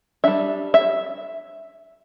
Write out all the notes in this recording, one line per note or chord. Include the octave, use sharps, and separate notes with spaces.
G3 D4 E5
E5